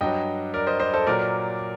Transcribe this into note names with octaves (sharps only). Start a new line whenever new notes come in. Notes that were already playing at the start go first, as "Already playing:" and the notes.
G2 F#3 D#5 G5
A#4 D5
C5 D#5
C5 D#5
A4 C5
A#2 F#3 A#4 D5